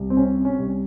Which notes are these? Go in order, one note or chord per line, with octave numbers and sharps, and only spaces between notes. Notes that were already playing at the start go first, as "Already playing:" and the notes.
Already playing: C2
C4
C3 C#4
C#4
C2